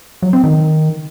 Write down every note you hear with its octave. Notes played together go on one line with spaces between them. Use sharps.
F#3
C4
D#3